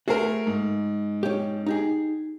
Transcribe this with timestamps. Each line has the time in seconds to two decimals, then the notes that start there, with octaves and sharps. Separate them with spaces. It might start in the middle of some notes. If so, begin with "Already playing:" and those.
0.08 A3 F#4 G#4 A#4 C5
0.47 G#2
1.23 C#4 G4
1.66 D#4 G4 G#4